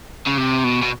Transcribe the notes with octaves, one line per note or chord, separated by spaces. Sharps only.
C#3
C3
B2
B2